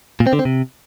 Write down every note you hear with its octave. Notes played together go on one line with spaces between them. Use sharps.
A#2
C4
D3
C4
C3